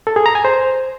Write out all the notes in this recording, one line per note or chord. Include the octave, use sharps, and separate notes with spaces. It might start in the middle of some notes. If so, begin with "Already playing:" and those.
A4
G#4
A#5
G#5
C5